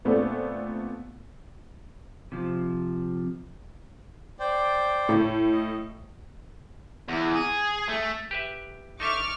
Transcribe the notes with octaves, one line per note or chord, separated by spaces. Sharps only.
A#2 A3 B3 C4 D4 A4
C3 F3
C5 D5 G5
A2
D#5
E2
G#4
A3
G4 B4 E5
G#1 D#4 A4 E5 C#6 D6 F6